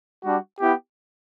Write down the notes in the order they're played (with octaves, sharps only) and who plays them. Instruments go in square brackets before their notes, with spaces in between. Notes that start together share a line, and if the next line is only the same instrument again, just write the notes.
[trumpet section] G3 D4 F#4
B3 E4 G4